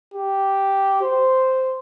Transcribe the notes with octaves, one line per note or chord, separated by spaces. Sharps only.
G4
C5